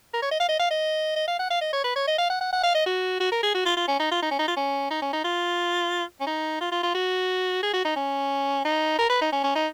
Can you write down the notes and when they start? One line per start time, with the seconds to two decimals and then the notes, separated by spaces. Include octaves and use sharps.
0.13 A#4
0.22 C#5
0.31 D#5
0.40 F5
0.48 D#5
0.59 F5
0.70 D#5
1.16 D#5
1.28 F5
1.39 F#5
1.51 F5
1.61 D#5
1.73 C#5
1.84 B4
1.96 C#5
2.07 D#5
2.18 F5
2.30 F#5
2.41 F#5
2.52 F#5
2.63 F5
2.75 D#5
2.86 F#4
3.20 F#4
3.32 A#4
3.43 G#4
3.54 F#4
3.66 F4
3.77 F4
3.88 C#4
3.99 D#4
4.11 F4
4.22 D#4
4.31 C#4
4.39 D#4
4.48 F4
4.56 C#4
4.91 D#4
5.02 C#4
5.13 D#4
5.24 F4
6.21 C#4
6.27 D#4
6.60 F4
6.72 F4
6.83 F4
6.94 F#4
7.63 G#4
7.73 F#4
7.85 D#4
7.96 C#4
8.65 D#4
8.99 A#4
9.10 B4
9.21 D#4
9.32 C#4
9.44 C#4
9.55 D#4